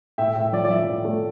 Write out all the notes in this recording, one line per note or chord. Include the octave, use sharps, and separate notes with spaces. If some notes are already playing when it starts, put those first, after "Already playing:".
A2 E5 G5
A2 E5
F3 D5
D5
F3 E5
A2
A3